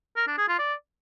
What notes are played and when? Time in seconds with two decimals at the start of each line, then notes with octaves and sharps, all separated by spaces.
0.16 A#4
0.27 D4
0.38 G#4
0.48 F4
0.59 D5